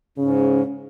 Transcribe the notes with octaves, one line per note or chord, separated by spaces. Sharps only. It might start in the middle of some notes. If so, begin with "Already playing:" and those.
G#2 C#3 C#4